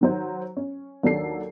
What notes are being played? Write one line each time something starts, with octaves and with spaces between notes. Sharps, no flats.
D#3 F#3 C5
C#4
D#2 F#3 D4 A4 C7